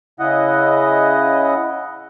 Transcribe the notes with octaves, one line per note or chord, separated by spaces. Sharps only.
C#3 E4 D#5 F#5